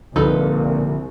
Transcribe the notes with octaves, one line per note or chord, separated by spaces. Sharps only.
C2 A#2 D3 F3 D#4 A4 B4